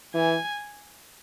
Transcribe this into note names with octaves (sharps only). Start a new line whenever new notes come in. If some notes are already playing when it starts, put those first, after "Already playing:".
E3 G#5